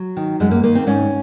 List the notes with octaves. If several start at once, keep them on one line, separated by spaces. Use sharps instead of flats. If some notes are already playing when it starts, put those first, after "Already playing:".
Already playing: F#3
D#3
F#2 G#3
A#3
D#3 A#3
C4
G#2 C#4